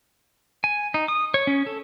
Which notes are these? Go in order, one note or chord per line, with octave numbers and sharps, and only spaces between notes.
G#5
D#4
D#6
C#5
C#4
A4